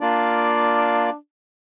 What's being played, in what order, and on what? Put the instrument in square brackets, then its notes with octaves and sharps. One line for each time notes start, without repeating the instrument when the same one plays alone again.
[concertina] A#3 F4 D5 [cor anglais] D4